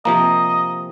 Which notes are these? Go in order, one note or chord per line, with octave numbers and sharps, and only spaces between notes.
C3 F3 A#3 D#5 A#5